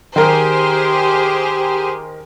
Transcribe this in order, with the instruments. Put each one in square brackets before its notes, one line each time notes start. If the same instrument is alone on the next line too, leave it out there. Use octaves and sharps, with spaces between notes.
[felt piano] D#3 A#4 [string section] G4 G#4 C5